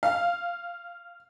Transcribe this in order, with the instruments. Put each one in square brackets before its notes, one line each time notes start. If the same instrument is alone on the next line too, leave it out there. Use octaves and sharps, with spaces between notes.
[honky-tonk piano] F5